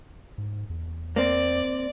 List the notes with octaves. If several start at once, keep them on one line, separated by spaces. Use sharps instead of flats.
G#2
E2
A#3 C4 D5